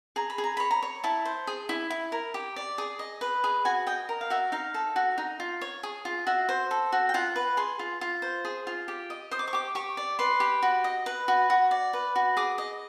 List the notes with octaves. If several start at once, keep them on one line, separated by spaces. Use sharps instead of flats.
G#4 A#5
B5
G#4
A#5
C#5 B5
A#5
C#5
E4 A5
C5
G#4
E4
E4
A#4
G4
D5
G#4
D#5
B4
G#4
F#4 G#5
D#5 G5
A#4
F5
F#4 E5
D#4 F5
A4
F#4
D#4
F4
C#5
G#4
F4
F#4 E5
C5
A4
F#4
G5
F4 F#5
B4
G#4 C6
F4
F4
C5
G#4
F4
G4
D#5
C5 D#6
D6
C#6
G4 D6
G4 C#6
D5
B4 C6
G4
F#4
D#5
B4
F#4
F#4
D5
B4
F#4
G#4 D6
D#5